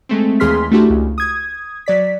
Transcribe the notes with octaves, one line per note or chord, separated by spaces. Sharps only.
G#3 A3 C4
D#2 E3 G#4 C6 F6 B6
A3 D4 E4 F#4 G4
C#2
D#6 G#6
F#3 D5 B6